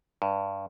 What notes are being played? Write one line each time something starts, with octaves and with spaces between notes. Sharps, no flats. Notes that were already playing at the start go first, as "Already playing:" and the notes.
G2